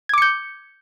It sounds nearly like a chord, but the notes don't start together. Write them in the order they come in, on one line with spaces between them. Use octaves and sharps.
G#6 D6 C#7 G6